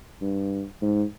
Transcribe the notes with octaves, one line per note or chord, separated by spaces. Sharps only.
G2
G#2